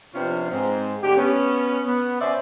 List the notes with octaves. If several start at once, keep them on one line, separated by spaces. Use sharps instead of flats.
C3 F3 B3 C#4 D4 F4
G#2 C4
D3 A3 D4 G4
B3 C#4
B3
B2 C#4 C5 D5 E5